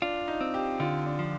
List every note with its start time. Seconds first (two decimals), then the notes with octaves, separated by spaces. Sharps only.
0.02 D4 F4
0.28 D#4
0.41 C4
0.54 G4
0.80 D3 F4
1.06 D4
1.19 F3